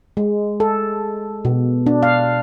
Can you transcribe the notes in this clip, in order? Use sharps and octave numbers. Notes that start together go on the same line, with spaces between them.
G#3
A4
B2
D4
F5